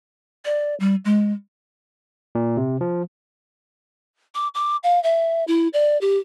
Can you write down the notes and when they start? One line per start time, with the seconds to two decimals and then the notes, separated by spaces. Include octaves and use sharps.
0.45 D5
0.80 G3
1.05 G#3
2.35 A#2
2.57 C3
2.81 F3
4.35 D6
4.55 D6
4.84 F5
5.03 E5
5.47 E4
5.73 D5
6.01 G4